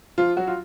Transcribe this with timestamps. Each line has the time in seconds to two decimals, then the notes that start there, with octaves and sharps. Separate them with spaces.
0.18 F3 F4
0.37 F#3 F#4
0.47 F4